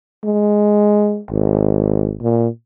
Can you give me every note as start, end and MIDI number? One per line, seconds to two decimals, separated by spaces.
0.24 1.20 56
1.30 2.16 32
2.22 2.48 46